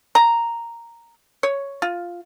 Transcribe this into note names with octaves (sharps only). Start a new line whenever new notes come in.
A#5
C#5
F4